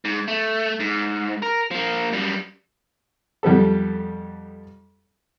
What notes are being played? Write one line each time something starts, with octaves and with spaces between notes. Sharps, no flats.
G#2
A3
G#2
A#4
F3 A#3
F#2 G3
F2 G3 B3 A4